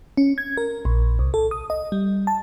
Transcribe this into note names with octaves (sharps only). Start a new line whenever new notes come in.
C#4
G#6
A#4
A#1
C2
A4
D#6
D#5
G3
A5